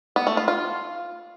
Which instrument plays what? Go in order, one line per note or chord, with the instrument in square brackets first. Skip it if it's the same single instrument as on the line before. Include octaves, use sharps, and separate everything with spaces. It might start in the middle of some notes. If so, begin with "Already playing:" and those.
[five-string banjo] B3
A3
F4
F4